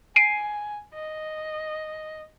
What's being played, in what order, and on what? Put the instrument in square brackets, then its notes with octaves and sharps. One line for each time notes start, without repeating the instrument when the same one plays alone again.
[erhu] G#5 [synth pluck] C7 D7 D#7
[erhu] D#5